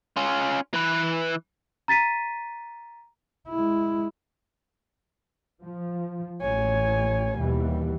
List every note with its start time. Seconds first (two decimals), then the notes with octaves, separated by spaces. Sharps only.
0.17 C#4 F4
0.74 E3 B4
1.88 A#5 A6 B6 D#7
3.49 G#3 E4
5.62 F3
6.41 A1 C#5 G#5
7.38 D#2 B2 E3 G3